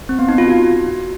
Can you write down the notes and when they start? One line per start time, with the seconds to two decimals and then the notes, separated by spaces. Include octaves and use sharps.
0.09 C4
0.19 B3
0.28 D#4
0.38 F4
0.48 F#4